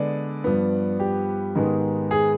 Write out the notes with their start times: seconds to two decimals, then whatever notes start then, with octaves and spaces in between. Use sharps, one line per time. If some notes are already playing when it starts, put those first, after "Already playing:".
Already playing: D3 G#3 B3 D5
0.44 G2 F3 B3
1.00 G4
1.55 G#2 D#3 G#3 B3
2.11 G#4